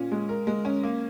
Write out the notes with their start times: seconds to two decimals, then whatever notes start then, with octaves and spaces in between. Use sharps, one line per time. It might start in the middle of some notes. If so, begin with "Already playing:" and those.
Already playing: A#2 C#4
0.11 G#3
0.29 A#4
0.47 G#3
0.65 C#4
0.83 A#3